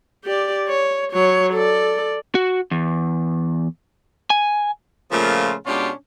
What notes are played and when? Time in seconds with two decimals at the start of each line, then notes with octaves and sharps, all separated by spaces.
0.24 G4 D5
0.68 C#5
1.12 F#3 C#5
1.54 A4 D5
2.35 F#4
2.71 E2
4.30 G#5
5.11 A#2 C#3 F3 A3 F4
5.66 B2 G#3 C#4 D4 F4 G4